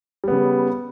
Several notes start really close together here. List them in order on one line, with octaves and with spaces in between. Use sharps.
G3 B3 C#3